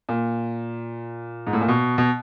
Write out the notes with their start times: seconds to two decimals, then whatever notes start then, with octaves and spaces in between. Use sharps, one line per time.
0.09 A#2
1.47 G#2
1.53 A2
1.61 A#2
1.68 B2
1.98 B2